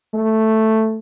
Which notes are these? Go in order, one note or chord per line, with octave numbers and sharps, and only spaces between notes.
A3